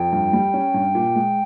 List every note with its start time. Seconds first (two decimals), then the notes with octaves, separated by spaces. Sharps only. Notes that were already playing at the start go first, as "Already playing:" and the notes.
Already playing: F2 G5
0.13 G2
0.33 G3
0.54 C#4
0.74 G2
0.95 A#2
1.15 G#3